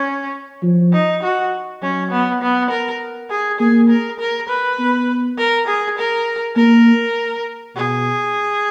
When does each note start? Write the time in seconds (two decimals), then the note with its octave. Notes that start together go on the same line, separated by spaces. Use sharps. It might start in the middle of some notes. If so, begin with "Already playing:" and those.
Already playing: C#4
0.63 F3
0.93 D#4
1.23 F#4
1.82 F#3 C#4
2.11 B3
2.42 B3
2.70 A#4
3.30 G#4
3.59 A#3 G#4
3.89 A#4
4.20 A#4
4.49 B4
4.79 B3
5.38 A#4
5.67 G#4
5.98 A#4
6.56 A#3 A#4
7.76 B2 G#4